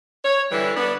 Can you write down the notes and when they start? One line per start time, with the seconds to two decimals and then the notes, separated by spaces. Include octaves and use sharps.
0.24 C#5
0.51 D3 E3 G3 E4
0.76 B3 D4